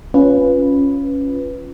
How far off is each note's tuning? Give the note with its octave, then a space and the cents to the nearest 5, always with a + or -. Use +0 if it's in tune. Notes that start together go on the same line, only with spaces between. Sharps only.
C#4 +0 F4 +0 B4 +0